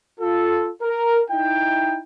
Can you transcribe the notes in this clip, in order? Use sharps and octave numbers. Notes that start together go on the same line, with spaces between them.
F4 A4
A#4
D#4 E4 G5